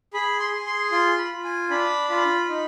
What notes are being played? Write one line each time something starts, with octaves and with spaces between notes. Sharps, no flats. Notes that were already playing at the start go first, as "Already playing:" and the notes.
G#4 B5
C6
G#4
C6
F4 C6
B5
F4
G#5
D4 B5
F4 B5
D#4